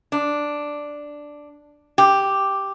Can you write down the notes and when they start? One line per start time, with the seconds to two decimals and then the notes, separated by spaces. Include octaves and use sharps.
0.12 D4
1.98 G4